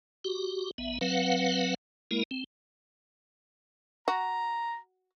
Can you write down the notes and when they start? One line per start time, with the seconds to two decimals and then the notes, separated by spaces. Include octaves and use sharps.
0.24 F#4 G4
0.78 A#1 B3 E5
1.01 F#3 C4 B4 F5 F#5
2.11 G#3 A#3 E4 A#4
2.31 C4
4.08 F#4 A#5